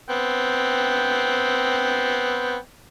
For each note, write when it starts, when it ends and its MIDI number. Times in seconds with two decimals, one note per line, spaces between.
0.10 2.57 59
0.10 2.57 60
0.10 2.57 79